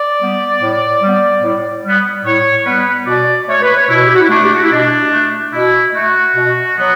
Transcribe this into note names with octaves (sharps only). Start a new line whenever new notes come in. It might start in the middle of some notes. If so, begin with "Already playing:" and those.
Already playing: D5
G3 B3
A2
G3 B3
A2
G3 B3
A2 C#5
G3 B3 B4
B2 D5
A3 C#5
B4
C#5
B2 E4
G4
F#4
E4
A3 D4
G4
F#4
E4
B2 D4
A3
B2 E4
A3 F#4
B2
F#3 B3